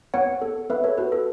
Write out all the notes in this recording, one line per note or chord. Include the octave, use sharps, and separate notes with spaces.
B3 C#5 F#5
A4
B3 B4 E5
A4 C#5
F#4 B4
A4